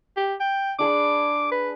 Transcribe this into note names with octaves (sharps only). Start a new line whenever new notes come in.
G4
G5
D4 G#4 B5 D6
B4